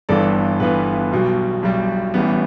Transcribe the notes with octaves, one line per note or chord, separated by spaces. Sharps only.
G1 G2 E3 B3 A4 D5
G1 G2 E3 B3 B4
B1 B2 G3
B1 B2 G3
A1 A2 E3 G3 B3